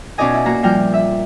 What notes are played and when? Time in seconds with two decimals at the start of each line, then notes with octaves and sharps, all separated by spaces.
0.18 B2 C#4 D#4 D5 D#5 G#5
0.34 E4
0.46 A#3 F#4 A#5
0.62 A#2 F3 G3 A#4 G5 F6
0.94 E5